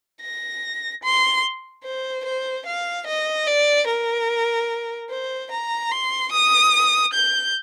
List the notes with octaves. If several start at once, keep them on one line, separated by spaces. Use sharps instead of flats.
A#6
C6
C5
C5
F5
D#5
D5
A#4
C5
A#5
C6
D#6
G6